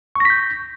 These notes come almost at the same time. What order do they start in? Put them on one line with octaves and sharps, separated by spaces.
C#6 A#6 B6 G6